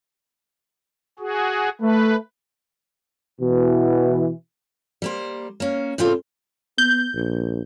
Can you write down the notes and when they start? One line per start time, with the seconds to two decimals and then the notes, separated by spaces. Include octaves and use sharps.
1.19 F#4 G#4
1.81 A3 B4
3.41 B2 E3
5.02 G3 A#3 C5
5.60 A#3 C#4
5.98 A2 C#3 C4 F4 A4
6.78 B3 G6
7.15 A#1